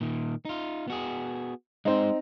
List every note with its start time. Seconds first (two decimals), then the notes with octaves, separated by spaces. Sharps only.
0.01 A#2 D#3
0.45 D#4 F4
0.88 B3 F#4 G#4
1.85 G#3 C4 D#4 C5